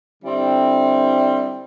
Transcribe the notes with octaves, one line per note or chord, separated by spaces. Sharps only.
D3 G3 C4 E4